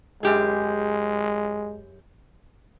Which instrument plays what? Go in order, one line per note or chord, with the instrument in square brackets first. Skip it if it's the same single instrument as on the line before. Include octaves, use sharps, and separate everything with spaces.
[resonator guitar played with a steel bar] F#2 G4 G#4 [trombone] G#3